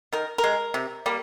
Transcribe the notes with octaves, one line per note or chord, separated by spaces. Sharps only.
D#3 A#4
A#4
G#3
C3
G3 A#3